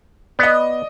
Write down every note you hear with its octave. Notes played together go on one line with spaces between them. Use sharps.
B3 D5 D#5